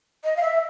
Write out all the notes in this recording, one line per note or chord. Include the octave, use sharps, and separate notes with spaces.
D#5
F5
E5